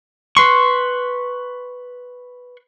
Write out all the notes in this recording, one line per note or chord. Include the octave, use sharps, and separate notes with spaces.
B4 C6 C#6